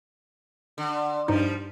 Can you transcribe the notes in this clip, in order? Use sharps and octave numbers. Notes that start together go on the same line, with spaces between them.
D3
G2 F3 G3 D#4